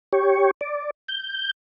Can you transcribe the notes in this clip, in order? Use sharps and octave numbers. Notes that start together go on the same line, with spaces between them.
G4 C#5
D5
G6